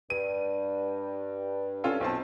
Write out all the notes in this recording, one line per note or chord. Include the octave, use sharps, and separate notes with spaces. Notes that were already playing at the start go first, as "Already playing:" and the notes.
G2 D#7
C#4 F4 A4
B1 C4 A5